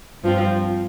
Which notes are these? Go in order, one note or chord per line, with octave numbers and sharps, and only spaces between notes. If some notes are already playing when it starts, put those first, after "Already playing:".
G2 F3 C4